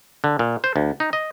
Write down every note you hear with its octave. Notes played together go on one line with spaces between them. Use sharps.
D3
A#2
C5
D2
D#4
D#5